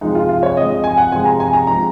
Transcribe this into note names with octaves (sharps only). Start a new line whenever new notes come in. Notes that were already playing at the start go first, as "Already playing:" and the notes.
C3 F3 G#3 D#4
F4
F4
C#5
C3 F3 G#3 D#5
D#5
G#5
F#5
C3 F3 G#3 G#5
A#5
G#5
A#5
C3 F3 G#3 A#5